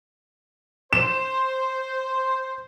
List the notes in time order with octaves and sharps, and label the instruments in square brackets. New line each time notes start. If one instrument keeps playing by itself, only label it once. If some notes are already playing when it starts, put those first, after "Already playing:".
[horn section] C5 [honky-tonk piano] E7